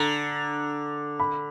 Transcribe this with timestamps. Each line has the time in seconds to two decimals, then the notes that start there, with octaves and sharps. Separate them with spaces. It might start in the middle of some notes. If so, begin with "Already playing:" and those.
Already playing: D3 A#5
1.20 B5